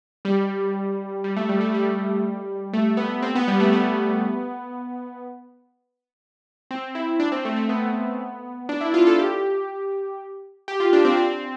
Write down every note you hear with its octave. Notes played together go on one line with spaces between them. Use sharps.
G3
G3
A3
G3
A3
G3
A3
B3
C4
B3
G3
A3
B3
C4
E4
D4
C4
A3
A3
B3
D4
E4
F4
A4
G4
G4
F4
D4
C4
C4